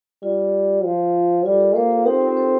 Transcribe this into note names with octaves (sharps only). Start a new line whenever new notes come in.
G3 F4
F3
G3 F4 A4
G4 A#4
A#3 A4 C5
F4 A4
C4 D#4 G4
F4
A4 C5